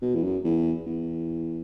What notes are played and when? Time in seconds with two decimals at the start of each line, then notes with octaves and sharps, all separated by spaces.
0.02 B2
0.15 E2
0.24 F#2
0.44 E2
0.86 E2